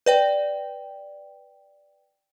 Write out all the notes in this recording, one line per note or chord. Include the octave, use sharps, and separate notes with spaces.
B4 D5 G5